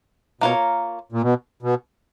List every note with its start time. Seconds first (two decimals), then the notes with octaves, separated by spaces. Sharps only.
0.41 B2 A#3 F4 A#4 C#5
1.12 A#2
1.22 B2
1.63 B2